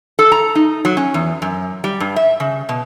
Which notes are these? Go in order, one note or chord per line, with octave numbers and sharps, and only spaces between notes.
A4
A#5
D#4
F#3
C#4
E2
F#2
G3
G2
E5
C#3
B2